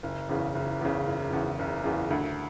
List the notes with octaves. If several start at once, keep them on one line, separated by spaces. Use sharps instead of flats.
F#1
E2 C#3
F#1
E2 C#3
F#1
E2 C#3
F#1
E2 C#3
D2